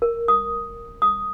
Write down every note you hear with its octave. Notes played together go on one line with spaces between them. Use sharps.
A#4
D#6
D#6